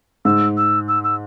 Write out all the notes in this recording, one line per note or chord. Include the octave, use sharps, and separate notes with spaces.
G#2 E6
E6
E6
E6